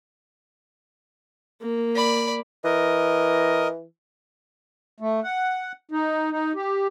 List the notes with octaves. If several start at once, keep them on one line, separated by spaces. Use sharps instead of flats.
A#3
D5 B5
E3 A#4 D#5
A3
F#5
D#4
D#4
G4